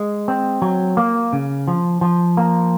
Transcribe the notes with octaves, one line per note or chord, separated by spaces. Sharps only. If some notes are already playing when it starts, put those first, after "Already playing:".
Already playing: G#3
C4
F#3
A#3
C#3
F3
F3
A#3